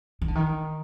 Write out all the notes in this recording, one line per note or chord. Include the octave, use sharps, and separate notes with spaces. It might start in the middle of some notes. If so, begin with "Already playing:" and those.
D#3
D3
D#3